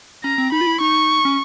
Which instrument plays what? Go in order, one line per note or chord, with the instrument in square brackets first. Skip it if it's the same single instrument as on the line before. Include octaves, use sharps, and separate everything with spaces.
[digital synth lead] C#4 [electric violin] A#5
[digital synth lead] C4
[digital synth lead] D#4 [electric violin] B5
[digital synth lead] F4
E4
[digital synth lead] D#4 [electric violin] C#6
[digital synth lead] C#4